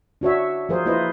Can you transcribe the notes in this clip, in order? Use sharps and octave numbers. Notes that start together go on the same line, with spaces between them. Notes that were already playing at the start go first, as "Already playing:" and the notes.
D4 F#4 C#5 E5
F3 F4 G#4 A#4 C5
A#3 E4 F4 B4 C5 D#5